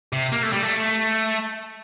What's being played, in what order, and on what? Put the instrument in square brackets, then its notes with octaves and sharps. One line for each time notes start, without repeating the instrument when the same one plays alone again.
[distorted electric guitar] C3
A#3
A3
G3
A3